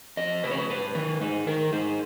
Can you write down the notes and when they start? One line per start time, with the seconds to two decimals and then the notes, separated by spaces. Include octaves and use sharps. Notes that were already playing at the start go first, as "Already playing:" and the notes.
0.17 F2 D#5
0.44 C#3 B4
0.51 C#5
0.57 B4
0.70 G#2 B4
0.95 D#3 B4
1.20 G#2 D#4
1.47 D#3 A#4
1.72 G#2 D#4